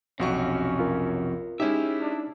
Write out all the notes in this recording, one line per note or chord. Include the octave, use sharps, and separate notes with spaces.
B1 F2 C3 C#4 F#4 C#6
F4 A#4
G#3 C#4 D#4 E4 G4 E5
D4